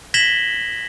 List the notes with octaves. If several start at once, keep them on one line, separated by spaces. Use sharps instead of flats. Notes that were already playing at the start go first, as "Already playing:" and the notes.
G#6 A#6 B6 E7 F#7 G7